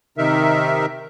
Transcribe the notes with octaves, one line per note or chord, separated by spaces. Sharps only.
C3 D#3 D#4 A#4 E5